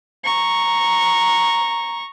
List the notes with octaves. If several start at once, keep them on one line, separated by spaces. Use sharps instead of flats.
A#5 C#6